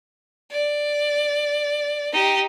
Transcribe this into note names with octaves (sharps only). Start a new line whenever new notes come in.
D5
D#4 G4